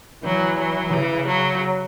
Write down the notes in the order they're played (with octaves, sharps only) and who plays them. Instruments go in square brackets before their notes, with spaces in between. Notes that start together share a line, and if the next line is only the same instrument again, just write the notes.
[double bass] E3 [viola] F#3
[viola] F#3
[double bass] C#3 [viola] E3
[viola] F#3